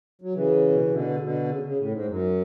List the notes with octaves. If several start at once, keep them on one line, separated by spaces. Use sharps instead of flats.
F#3
C#3 E3
B2
C#3
B2 D3
C#3
B2 D3
C#3
C#3
A2
G#2
F#2